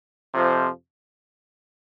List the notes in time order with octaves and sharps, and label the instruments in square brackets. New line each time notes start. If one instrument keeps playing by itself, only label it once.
[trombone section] F2 C3 F3